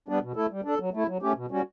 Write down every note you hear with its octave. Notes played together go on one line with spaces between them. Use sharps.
G3 B3 D4
B2
A3 E4 A4
G3
D4 A4
F#3
A3 E4
F#3
A3 C#4 G4
B2
G3 C#4 F#4